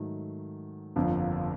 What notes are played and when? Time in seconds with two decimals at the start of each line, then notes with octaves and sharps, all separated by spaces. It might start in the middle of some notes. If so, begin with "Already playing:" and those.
Already playing: G#2 D#3 F#3 A3
0.96 G1 F2 D3 F3 A#3